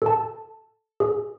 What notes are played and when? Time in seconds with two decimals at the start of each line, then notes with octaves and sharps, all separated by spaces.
0.02 A4 A5
1.00 G#4